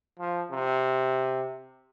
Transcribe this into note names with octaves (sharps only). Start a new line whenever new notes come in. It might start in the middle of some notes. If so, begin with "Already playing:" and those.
F3
C3